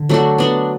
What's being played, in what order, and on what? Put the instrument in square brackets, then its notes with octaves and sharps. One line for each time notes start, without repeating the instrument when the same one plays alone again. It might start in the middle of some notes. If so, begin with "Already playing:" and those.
Already playing: [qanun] D3
F#3 A3 D4 F#4
B3 D4 F#4